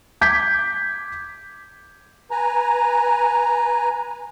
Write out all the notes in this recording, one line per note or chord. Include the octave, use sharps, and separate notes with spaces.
D6 G6 G#6 B6
B4 G#5 A#5